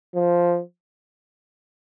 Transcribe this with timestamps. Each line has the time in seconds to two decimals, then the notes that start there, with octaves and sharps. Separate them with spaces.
0.15 F3